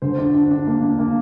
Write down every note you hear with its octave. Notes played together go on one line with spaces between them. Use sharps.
D3 C5
D4
D4
D4
A#3
D4
A#3